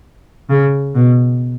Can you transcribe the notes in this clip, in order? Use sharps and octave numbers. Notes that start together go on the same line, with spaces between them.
C#3
B2